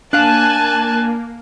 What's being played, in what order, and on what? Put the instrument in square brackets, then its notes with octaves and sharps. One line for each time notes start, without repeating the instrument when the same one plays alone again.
[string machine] A#3 [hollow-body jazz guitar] D4 F5 [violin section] G#5 A5 [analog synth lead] F#6